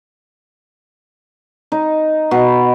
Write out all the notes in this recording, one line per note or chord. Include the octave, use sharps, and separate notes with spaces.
D#4
B2